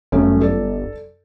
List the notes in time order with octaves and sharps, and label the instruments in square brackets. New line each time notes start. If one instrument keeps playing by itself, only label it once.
[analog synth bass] G1 [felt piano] F#2 A3 C#4
[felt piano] A4 D5